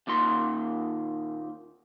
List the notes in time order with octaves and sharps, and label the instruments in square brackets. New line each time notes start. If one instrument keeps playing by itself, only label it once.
[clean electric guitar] D#2 A#2 D#3 C6